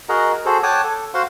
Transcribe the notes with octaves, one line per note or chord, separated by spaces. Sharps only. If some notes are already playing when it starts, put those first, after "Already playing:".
F#4 G#4 A#4 D#5 F#5 A#5
F#4 G#4 A4 C5
C#5 F#5 G5 A5 D6 D#6
A4
F#4 C5 F5 F#5 C6